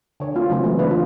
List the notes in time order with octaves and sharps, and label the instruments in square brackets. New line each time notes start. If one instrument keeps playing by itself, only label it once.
[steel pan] D3 C#5
A3 C4 F4
C#3 E3 F#3 A3 C4 C#4
G#3 A3 B3
C#3 E3 B3 D4 B4
F4